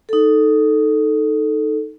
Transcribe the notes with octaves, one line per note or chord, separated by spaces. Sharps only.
D#4 A4